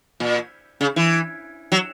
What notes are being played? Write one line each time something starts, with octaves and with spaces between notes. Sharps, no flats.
A#2
C#3
E3
F#3